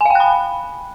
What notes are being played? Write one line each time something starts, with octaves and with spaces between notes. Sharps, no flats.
F5 G5 G#5 B5 F#6